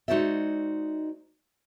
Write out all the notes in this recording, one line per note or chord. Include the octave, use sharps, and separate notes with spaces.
G#3 D#4 F#4 C5 D5 E5